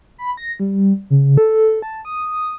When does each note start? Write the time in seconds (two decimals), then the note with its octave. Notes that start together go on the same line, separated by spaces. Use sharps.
0.18 B5
0.37 A#6
0.60 G3
1.10 C#3
1.38 A4
1.82 A5
2.05 D#6